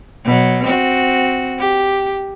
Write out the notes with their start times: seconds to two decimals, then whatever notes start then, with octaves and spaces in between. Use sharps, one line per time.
0.25 B2 F#3
0.64 C4 F#4
1.59 G4